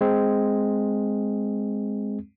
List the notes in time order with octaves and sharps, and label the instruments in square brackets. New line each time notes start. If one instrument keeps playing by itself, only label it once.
[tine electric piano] G#3 C4